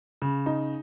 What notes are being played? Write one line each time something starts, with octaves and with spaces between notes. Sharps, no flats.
C#3
D#4